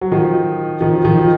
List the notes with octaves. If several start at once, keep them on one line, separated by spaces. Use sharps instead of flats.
F#3
D#3 F3
D#3 F3
D#3 F3